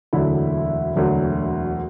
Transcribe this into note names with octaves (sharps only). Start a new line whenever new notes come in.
E1 D2 D3 F#3 E4
E1 D2 D3 F#3